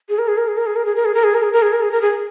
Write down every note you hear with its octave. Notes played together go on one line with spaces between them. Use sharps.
G#4
A#4
G#4
A#4
G#4
A#4
G#4
A#4
G#4
A#4
G#4
A#4
G#4
A#4
G#4
A#4
G#4
A#4
G#4
A#4
G#4